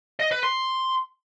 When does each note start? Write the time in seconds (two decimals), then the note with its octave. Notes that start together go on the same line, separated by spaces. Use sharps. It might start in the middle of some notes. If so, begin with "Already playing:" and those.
0.20 D#5
0.31 B4
0.43 C6